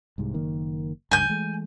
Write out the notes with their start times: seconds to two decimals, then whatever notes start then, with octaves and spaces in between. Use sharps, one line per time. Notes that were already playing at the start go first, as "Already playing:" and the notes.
0.18 C2 G#2 C3
0.34 F#1 D#3 A#3
1.11 F#1 C#2 G2 G#5 G6
1.29 E3 G#3 A3